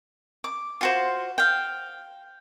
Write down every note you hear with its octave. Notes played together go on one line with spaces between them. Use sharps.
D6
F4 F#4 C5
F5 G5